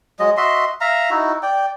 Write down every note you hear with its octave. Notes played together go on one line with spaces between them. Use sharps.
F#3 G#3 D#5
F#4 D#5 E5 C6
E5 F5 A#5
D#4 E4 F#4
D5 G5